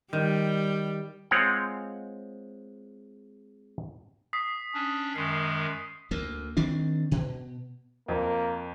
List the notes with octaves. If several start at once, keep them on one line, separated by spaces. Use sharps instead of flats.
D#3 G3
G#3 C4 F4 C#5 F#5
D#6 B6 C7
C#4 D4
F#2 D#3 G#3 C7
D2 A#3
D#3 C4 D4
B2
F2 A#3